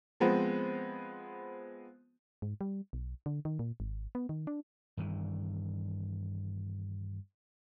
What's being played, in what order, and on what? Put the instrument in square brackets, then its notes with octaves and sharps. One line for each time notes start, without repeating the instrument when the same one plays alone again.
[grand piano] F3 G#3 B3 C4
[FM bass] G#2
G3
B1
D3
D#3
A#2
G#1
B3
D#3
D4
[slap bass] G2 D#3 E3